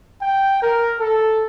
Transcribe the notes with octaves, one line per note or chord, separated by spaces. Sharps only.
G5
A#4
A4